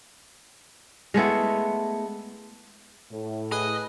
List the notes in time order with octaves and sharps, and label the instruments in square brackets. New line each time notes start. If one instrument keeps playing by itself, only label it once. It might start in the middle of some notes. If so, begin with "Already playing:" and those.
[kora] G#3 A3 B3 E4
[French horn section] A2
[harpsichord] G#4 [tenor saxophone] B4 [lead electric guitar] D#5